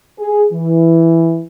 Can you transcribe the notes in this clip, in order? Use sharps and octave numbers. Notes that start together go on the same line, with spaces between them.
G#4
E3